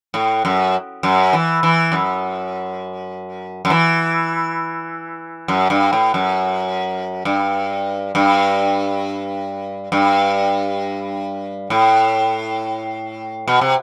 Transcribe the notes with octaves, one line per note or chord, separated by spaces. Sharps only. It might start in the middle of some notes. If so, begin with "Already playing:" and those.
A2
F#2
F#2
E3
E3
F#2
F#2
E3
F#2
G2
A2
F#2
G2
G2
G2
A2
B2
C3